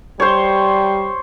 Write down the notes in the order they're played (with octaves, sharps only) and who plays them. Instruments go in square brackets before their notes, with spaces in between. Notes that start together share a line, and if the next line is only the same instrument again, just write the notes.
[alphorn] G3 [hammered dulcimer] C5 C#5